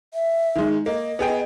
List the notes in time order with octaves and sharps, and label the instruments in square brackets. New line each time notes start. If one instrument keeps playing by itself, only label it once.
[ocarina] E5
[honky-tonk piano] D#3 G#3
[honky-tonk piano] A#3 [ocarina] D#5
[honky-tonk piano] B3 G#4 G5